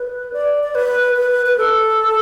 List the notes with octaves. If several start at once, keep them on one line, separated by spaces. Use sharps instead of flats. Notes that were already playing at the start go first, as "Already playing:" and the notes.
Already playing: B4
D5
D5
B4
B4
B4
A4